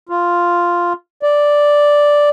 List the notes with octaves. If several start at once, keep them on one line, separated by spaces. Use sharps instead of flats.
F4
D5